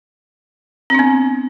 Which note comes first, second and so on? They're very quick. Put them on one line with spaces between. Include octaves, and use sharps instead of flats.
C4 D4 B3